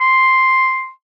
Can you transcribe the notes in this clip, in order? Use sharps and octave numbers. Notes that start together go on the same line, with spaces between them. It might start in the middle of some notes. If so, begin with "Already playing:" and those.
C6